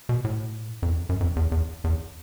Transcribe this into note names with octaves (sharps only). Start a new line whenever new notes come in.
B2
A2
F2
E2
F2
F#2
F2
E2
E2
E2